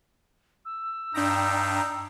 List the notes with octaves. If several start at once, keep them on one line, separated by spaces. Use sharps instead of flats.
E6
G2 D4 D#4 G5 A#5